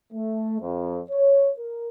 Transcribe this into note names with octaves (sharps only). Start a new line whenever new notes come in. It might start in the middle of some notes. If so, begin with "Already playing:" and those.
A3
F2
C#5
A#4